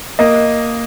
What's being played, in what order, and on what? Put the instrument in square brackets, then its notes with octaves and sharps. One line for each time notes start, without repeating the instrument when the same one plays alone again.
[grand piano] A#3 D#5